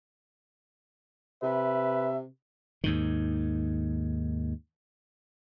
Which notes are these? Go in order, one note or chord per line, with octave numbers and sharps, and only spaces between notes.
C3 B4 E5
D#2 G#2 D#3